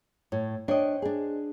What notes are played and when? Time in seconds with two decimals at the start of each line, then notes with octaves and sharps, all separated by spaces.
0.32 A2 C#5
0.68 D4 C5 C#5 D#5 G5
1.02 D4 G#4